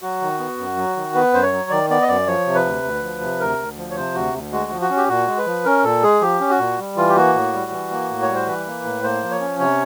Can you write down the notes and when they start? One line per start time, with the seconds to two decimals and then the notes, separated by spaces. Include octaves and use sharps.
0.02 F#3 F#4
0.21 D#3
0.39 B3
0.58 F#2
0.77 F#3
0.96 D#3
1.15 B3 B4
1.33 F#2 C5
1.43 C#5
1.53 F#3
1.70 D#3 D5
1.90 B3 D5
2.02 D#5
2.08 F#2 D5
2.27 F3 C#5
2.46 C3
2.55 B4
2.65 D2
2.83 D2
3.03 F3
3.21 C3
3.40 D2 A#4
3.58 D2
3.77 F3
3.91 C#5
3.96 C3 C5
4.14 D2 F#4
4.34 D2
4.52 G#3 F#4
4.71 F3
4.81 F#4
4.90 C#4
4.97 G4
5.09 A#2 F#4
5.27 G#3
5.38 B4
5.46 F3
5.65 C#4 A#4
5.84 A#2 A4
6.03 G#3 G#4
6.21 F3 G4
6.40 C#4
6.50 F#4
6.59 A#2
6.79 G3
6.96 E3 F4
7.09 G4
7.16 A#3 F#4
7.34 A2
7.53 G3
7.72 E3
7.91 A#3
8.09 A2
8.22 C#5
8.28 G3
8.35 C5
8.46 E3 B4
8.66 A#3
8.84 A2
9.03 A#3 C5
9.23 F3
9.31 C#5
9.40 C#4
9.60 C3 C#5